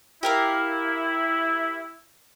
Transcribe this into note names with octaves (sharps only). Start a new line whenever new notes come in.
E4 G4 A#4 F5